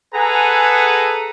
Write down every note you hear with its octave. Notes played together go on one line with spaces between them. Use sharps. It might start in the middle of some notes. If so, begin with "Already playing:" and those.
G#4 A4 B4 F#5 G#5 A#5